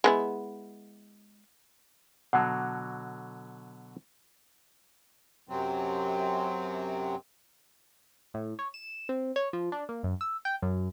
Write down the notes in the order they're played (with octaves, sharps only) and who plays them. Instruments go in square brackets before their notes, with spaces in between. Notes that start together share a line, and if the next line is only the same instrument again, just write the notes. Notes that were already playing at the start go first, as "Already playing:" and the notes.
[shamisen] G#3 B3 E4
[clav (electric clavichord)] B2 D3 F#3 [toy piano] F#5 A5
[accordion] F#2 C3 F#3 C4
[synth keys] A2
C#5
E7
C4
C#5
F3
D4
A#3
F#2
E6
G5
F#2